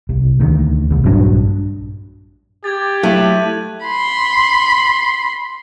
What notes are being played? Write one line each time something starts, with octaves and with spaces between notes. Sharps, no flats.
C2
D2 D#3
C2
A#1 G2 F#3 D4
G4 G#6 A6
F#3 A3 E4 F#6 D#7 F#7
B5 C6